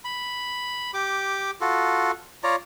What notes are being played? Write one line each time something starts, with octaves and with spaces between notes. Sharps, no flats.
B5
G4 D6
F4 F#4 A4
F4 C#5 D5 A#5